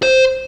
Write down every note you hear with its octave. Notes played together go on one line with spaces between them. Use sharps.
C5